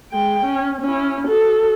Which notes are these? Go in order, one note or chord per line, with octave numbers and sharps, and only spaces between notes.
G#3 G5
C#4
C#4 E4
F#4 A4